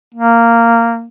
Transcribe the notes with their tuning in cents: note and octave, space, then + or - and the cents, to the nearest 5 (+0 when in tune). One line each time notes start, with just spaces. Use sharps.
A#3 -10